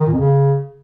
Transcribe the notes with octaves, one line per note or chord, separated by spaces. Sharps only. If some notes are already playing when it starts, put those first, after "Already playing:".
D#3
A#2
F2
C#3